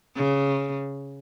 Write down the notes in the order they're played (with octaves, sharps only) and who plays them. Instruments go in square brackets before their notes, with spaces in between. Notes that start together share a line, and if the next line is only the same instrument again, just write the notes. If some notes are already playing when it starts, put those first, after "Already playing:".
[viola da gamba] C#3